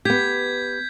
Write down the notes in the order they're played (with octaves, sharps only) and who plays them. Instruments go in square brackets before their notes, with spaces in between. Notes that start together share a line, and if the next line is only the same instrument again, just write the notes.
[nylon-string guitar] B3 G4 [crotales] G6 G#6 B6